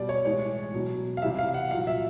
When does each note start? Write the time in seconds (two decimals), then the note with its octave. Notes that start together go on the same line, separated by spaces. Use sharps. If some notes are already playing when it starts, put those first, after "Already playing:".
Already playing: B2 G3 D5
0.09 C#5
0.25 A2 E3 G#3 C#5
0.73 B2 F#3
1.17 F5
1.22 C3 E3 G3 E5
1.39 F5
1.54 F#5
1.71 A#2 F#3 F5
1.87 E5